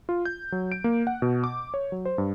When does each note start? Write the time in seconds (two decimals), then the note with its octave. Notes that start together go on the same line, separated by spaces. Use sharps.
0.09 F4
0.25 G6
0.52 F#3
0.72 D7
0.84 A#3
1.07 F#5
1.22 B2
1.44 D6
1.74 C#5
1.92 F#3
2.05 C5
2.18 G2